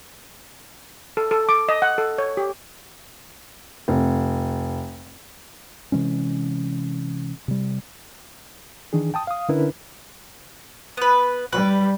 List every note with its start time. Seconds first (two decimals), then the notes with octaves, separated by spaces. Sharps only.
1.17 A4
1.31 A4
1.49 D6
1.69 D#5
1.82 F#5
1.98 A4
2.18 C#5
2.37 G4
3.88 F1
5.92 C3 E3 G#3 C#4
7.48 C3 G3
8.93 D#3 E3 D4 G#4
9.14 G5 A5 D#6
9.27 F5 D#6
9.49 D3 C#4 D4 E4 A#4 B4
10.97 B3 B4
11.53 G3 B4